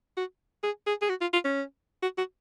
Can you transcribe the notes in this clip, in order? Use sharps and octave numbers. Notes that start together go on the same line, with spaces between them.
F#4
G#4
G#4
G#4
F#4
F4
F4
C#4
F#4
F#4